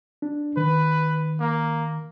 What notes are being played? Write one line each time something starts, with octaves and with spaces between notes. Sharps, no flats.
D4
D#3 B4
A#3